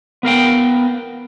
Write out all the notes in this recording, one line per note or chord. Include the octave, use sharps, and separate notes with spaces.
B3 A#4 F5 G5